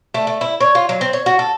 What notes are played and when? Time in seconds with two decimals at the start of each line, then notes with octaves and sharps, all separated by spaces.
0.14 A3
0.27 A3
0.41 E4
0.60 C#5
0.75 F4
0.89 F#3
1.01 C4
1.13 C#5
1.26 F#4
1.39 A4